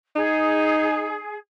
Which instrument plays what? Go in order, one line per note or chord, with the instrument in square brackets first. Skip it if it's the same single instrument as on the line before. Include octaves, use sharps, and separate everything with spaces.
[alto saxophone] D#4 [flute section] G#4